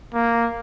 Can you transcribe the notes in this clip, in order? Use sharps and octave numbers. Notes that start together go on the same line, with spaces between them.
A#3